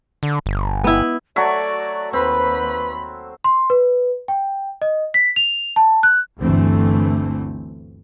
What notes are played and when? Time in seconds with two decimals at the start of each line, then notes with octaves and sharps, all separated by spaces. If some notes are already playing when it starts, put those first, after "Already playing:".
0.23 D3
0.46 G1
0.84 B3 E4
1.36 F#3 A3 F#4 D5 E5 C#6
2.13 D#2 C4 B4 B5
3.44 C6
3.70 B4
4.28 G5
4.82 D#5
5.14 B6
5.36 F7
5.76 A5
6.03 F#6
6.40 G1 D2 D3 E3 A3 C4